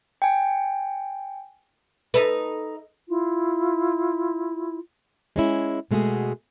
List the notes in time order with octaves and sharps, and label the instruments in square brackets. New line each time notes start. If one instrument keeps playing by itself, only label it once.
[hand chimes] G5 G#5
[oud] D#4 A4 B4
[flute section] E4 F4
[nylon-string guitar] G#3 C#4 E4
B2 G#3 A3 F#4 G#4